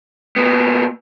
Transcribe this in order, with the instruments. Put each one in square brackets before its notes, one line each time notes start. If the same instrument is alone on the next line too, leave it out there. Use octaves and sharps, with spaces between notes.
[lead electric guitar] A#2 B3